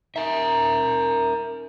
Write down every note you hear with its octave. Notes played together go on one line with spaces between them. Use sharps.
D#4 A#4 E5